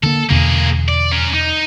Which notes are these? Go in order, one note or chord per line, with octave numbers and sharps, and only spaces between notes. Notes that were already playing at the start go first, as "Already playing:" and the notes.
D3 A#3 A4
E2 B2 D3 A#3 G#4
D5
C#4 A#4
D#4